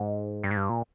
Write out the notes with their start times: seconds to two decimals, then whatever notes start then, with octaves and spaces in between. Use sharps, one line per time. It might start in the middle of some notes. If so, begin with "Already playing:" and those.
Already playing: G#2
0.43 G2
0.51 G#2
0.57 G2
0.69 A#2